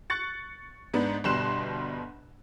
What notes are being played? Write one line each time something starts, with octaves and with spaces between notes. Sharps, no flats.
C#6 F#6 A6 C#7
G#2 B3 D4
G1 B2 G3 C6 F#6 E7